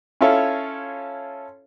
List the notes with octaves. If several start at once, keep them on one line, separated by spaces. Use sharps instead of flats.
C#4 E4 F4 A4 C#5